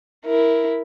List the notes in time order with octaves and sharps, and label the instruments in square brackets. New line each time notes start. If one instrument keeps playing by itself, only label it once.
[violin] E4 A#4